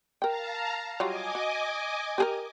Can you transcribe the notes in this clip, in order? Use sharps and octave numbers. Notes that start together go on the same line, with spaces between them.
A#4 F5 G5 A5 A#5
F#3 G3 F4 D#5 G#5 D6
F#4
G4 G#4 A#4